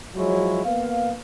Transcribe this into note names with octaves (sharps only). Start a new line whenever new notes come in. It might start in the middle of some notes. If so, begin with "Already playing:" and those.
F3 F#3 G#3 E4 C#5
A#3 B3 F5